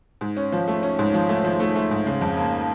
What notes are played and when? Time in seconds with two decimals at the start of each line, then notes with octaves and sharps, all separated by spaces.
0.21 G#2
0.37 C#4
0.52 F3
0.68 A3
0.83 C#4
0.99 G#2
1.14 F3
1.29 A3
1.45 F3
1.60 A3
1.75 A3
1.91 G#2
2.06 C#3
2.21 F2
2.37 A#3